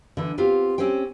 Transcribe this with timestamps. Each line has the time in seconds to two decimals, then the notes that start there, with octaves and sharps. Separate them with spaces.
0.17 D3 E3
0.38 B3 C4 F4 G4
0.78 C4 C#4 G4 C5 G5